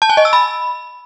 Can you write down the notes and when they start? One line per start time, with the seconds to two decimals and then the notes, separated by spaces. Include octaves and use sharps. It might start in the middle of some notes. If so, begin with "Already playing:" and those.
0.02 A5
0.10 G#5
0.17 D#5
0.25 E6
0.33 B5